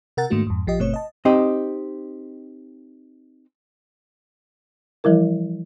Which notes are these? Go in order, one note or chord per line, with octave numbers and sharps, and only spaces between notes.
C3 A#4 F#5 A6
G#2 D#3 A3 A#3 D4 F#4
F2 G#2
A#1 F3 G4 D#5
G1 B2 A3 C4 C#5
D#5 A5
C4 D#4 G4 D#5
E3 F3 G3 E4 A#4